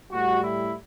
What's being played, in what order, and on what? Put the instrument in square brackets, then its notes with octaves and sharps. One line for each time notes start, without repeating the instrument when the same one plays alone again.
[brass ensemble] A2 G3 F#4
E4